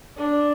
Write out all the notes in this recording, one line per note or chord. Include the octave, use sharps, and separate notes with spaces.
D4